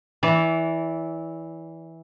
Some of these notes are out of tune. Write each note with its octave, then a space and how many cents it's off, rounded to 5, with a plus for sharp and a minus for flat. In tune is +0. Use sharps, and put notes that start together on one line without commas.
E3 -10 D5 -30